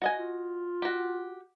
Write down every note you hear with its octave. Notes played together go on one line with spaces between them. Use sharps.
F#4 D#5 G#5
F4
F#4 G4